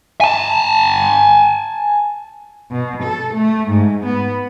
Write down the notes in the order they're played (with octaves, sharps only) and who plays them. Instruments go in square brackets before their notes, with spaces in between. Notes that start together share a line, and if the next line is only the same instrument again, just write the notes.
[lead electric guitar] G#5 A5
[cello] B2
A4
A3
G#2
B3